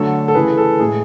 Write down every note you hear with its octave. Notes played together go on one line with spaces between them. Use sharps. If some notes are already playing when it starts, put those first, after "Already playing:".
Already playing: D3 F#3 A3 A4
A4
C#3 E3 A3 G#4 B4
A4
A2 G#3 G#4